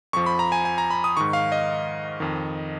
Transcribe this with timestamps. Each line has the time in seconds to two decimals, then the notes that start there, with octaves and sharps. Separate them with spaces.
0.13 F2 F3 C#6
0.26 B5
0.39 A#5
0.52 G#5
0.65 G#5
0.78 A#5
0.91 B5
1.04 D#6
1.17 G#2 D#3 C#6
1.33 F5
1.52 D#5
2.20 F2 D#3